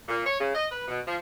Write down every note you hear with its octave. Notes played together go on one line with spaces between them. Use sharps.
A#2
C#5
C#3
D#5
B4
B2
F3